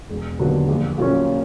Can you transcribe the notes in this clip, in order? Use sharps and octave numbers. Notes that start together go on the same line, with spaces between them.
E1
D#2 D3 F#3 B3
A#1
A#2 F#3 A#3 C#4